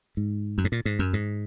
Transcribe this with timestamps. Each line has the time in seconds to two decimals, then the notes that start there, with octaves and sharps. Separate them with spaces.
0.17 G#2
0.58 F#2
0.64 G#2
0.72 A#2
0.85 G#2
0.99 F#2
1.13 G#2